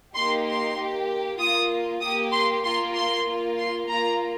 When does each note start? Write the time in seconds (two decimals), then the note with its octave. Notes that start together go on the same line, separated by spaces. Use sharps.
0.15 A#3 D#4 G4 C6
0.46 C6
0.77 A#3 G4
1.39 A#3 F4 D#6
2.01 A#3 G4 D#6
2.32 C6
2.64 A#3 F4 C6
2.95 C6
3.26 A#3 F4
3.57 C6
3.88 A#3 F4 A#5